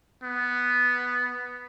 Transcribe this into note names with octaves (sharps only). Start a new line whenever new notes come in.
B3